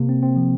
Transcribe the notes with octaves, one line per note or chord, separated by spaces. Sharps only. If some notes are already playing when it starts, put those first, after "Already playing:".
Already playing: C3 A#3
C4
C4
F3